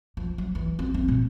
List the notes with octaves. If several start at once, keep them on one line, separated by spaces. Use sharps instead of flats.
F3
F#3
E3
C4
C4
A#2